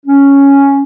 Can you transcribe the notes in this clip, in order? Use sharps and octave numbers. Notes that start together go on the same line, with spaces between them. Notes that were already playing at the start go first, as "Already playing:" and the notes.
C#4